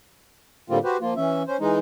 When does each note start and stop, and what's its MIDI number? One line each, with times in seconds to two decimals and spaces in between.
0.70 0.79 45
0.70 0.79 50
0.70 0.79 55
0.70 0.79 58
0.70 0.79 60
0.70 0.79 65
0.84 0.97 66
0.84 0.97 67
0.84 0.97 71
0.84 0.97 72
1.01 1.14 53
1.01 1.14 58
1.01 1.14 65
1.17 1.43 52
1.17 1.43 61
1.17 1.43 76
1.48 1.57 61
1.48 1.57 72
1.60 1.79 52
1.60 1.79 56
1.60 1.79 63